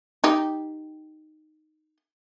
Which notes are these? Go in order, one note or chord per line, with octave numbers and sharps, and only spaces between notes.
D#4 G4